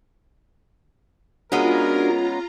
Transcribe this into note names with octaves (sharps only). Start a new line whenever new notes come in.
G#3 B3 C#4 D4 F4 F#4 A#4 A#5